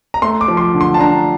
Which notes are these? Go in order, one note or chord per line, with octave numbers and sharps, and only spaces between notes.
A#5
A3 C6
D6
F3
C6
D6
D3
C6
A5
D4 A#5